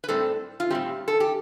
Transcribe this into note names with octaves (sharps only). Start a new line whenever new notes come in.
B4
A2 G3 C4 A4
F4
A2 G3 C4 G4
A4
G4